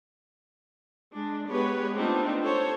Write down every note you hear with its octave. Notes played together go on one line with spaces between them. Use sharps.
G#3 D4
G#3 B3 G4 B4 C#5
A3 B3 C4 D4 D#4 F4
A4 C5 C#5